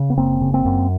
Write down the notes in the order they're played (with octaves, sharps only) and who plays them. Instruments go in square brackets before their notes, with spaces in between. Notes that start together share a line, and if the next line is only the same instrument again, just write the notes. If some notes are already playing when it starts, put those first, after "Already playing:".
Already playing: [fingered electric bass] C#3
B3
F#1 A#3 C4
C#3
A#3 C4
F#2